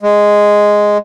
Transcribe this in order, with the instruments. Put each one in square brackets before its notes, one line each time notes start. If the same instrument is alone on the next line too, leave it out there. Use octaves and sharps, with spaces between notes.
[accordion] G#3